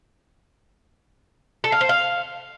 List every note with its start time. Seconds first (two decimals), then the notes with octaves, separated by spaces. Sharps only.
1.64 A4
1.72 F5
1.81 C5
1.89 F5